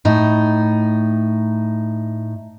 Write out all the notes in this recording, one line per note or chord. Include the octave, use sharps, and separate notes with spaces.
A2 D#4